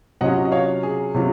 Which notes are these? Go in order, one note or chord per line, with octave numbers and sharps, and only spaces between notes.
C3 F#3 C#4 F4 D#5 F#5
D#5
C#5 F5
G#4
C3 F#3 C#4 F4